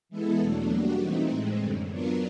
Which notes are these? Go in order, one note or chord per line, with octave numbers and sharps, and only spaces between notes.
E3 G#3 B3 E4 A4
E2 B2 F#3 A3 D4
G3 A#3 D4 F#4
E3 A3 C4 D#4
A2 E3 G#3 C4
F#2 D3 G3
F#3 B3 D4 F4 A#4